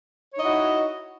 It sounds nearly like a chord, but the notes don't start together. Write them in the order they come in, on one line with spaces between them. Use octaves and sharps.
C#5 D#4 D#5 E4 F#4